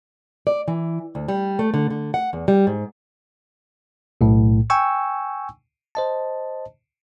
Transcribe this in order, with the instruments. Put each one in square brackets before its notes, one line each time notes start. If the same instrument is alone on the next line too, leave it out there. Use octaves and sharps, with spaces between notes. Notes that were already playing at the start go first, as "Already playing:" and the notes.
[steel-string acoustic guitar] D5
E3
D2
G3
A3
D3
D3
F#5
E2
G3
G#2
[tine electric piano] B1 A2
G5 G#5 C#6 E6
C5 D#5 A5